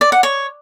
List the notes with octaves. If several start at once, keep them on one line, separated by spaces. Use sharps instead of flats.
D5
F#5
C#5